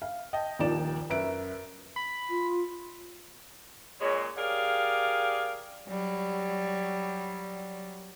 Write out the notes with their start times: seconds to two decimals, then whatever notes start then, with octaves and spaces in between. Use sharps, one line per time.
0.02 F5
0.33 D#5 G5 A5
0.59 D#1 D#2 F3 D#4 D5 E7
1.10 F#2 B4 E5 D7
1.96 B5
2.30 F4
4.00 A#2 G#3 C#4 C#5
4.38 G4 G#4 A#4 D5 F5
5.86 F#3 G3